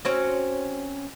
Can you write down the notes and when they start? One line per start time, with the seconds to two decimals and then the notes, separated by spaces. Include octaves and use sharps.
0.05 C4 C#4 F#4